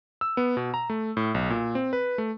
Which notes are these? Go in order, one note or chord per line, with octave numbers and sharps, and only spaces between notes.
E6
B3
B2
A#5
A3
A2
B1
A#2
C4
B4
A3